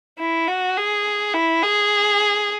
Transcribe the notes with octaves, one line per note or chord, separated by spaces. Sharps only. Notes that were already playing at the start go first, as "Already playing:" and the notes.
E4
F#4
G#4
E4
G#4